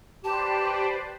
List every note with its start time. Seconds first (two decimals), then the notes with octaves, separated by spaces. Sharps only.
0.25 G4 B4 C5 D5 A5